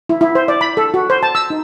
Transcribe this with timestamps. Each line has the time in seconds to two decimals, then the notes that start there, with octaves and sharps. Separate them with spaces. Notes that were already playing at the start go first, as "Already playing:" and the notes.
0.09 E4
0.21 E4
0.35 C5
0.48 D5
0.61 B5
0.77 A4
0.94 F#4
1.10 C5
1.23 A5
1.35 E6
1.50 D#4